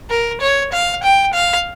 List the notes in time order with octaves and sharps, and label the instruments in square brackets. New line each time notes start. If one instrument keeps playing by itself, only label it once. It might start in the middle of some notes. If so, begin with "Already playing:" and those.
[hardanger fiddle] A#4
C#5
F5
G5
F5